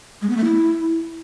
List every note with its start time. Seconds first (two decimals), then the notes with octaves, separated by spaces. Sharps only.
0.22 G#3
0.29 B3
0.37 A3
0.45 E4